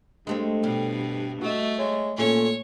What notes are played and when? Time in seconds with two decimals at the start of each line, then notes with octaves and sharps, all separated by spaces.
0.27 G2 G#3 A3 C4
0.64 B2 G3
1.42 A3 F#4 D#5
1.78 G#3 C#5
2.18 A#2 A3 C#4 C#5